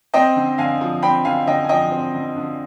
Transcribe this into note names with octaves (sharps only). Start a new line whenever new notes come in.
C4 D#5 G5
D3
D3 F5 G#5
F3
C4 G5 B5
D3 F5 G#5
D3 D#5 G5
G#5
F3 D#5 G5
C4
D3
D3